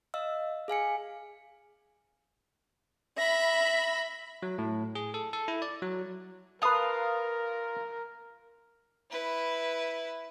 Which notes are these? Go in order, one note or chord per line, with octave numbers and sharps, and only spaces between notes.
D#5 F5 E6
G#4 F5 G#5 C#7
E5 B5 A#6
F#3
A2
G#4
A4
A4
E4
D5
F#3
F4 A#4 B4 F5 A5 D#6
E4 B4